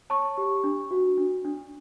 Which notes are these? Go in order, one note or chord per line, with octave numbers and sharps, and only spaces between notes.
C#5 A5 C#6
G4
D4
F#4
D4
D4